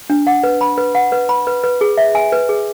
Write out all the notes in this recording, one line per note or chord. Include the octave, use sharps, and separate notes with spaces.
D4
F#5
B4
B5
B4
F#5
B4
B5
B4
B4
G#4
E5
G#5
B4
G#4